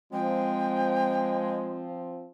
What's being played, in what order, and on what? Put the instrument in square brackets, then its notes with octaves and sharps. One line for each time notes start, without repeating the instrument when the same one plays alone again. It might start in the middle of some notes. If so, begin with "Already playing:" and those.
[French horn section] F3 C4 [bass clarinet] G#3 [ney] G5